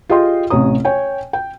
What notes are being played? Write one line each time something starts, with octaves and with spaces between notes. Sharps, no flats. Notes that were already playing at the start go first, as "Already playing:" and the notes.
F4 G4 G#4 D#5 G5 C6
A1 C3 C#5 A#5 D#6
C#5 G5 G#5
G5